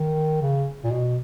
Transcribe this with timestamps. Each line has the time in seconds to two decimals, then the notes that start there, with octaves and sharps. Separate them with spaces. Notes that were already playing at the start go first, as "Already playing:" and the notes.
Already playing: D#3
0.42 C#3
0.84 A#2
0.91 B2